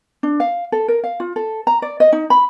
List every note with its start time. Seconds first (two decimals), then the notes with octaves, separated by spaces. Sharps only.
0.23 D4
0.40 F5
0.72 A4
0.88 A#4
1.04 F5
1.20 F4
1.36 A4
1.67 A#5
1.82 D5
2.00 D#5
2.13 D#4
2.30 B5